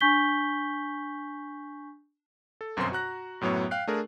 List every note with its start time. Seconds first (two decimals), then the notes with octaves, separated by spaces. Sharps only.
0.01 D4 G#5 C#6 G6 B6 G7
2.61 A4
2.77 G1 F#2 B2 C4 C5 C6
2.92 F#4 A#5 F#6 A#6
3.41 F#2 A2 F#3 B3 C#5
3.71 F5 G5 F#6 C7
3.87 A3 D4 G#4 A#4